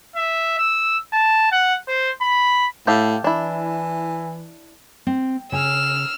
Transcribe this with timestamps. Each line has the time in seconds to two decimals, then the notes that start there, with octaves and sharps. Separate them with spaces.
0.16 E5
0.59 E6
1.13 A5
1.52 F#5
1.88 C5
2.21 B5
2.87 A2 G4 A4 F5
3.24 E3 D4 E4
5.07 C4
5.52 C#3 G#5 E6 F6